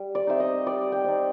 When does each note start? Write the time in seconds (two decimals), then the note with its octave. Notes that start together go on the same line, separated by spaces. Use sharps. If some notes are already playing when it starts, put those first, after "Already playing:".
Already playing: G3
0.15 D5
0.27 C4 D#4 E5
0.40 D#5
0.66 G3 D5
0.92 G5
1.04 C4 D#4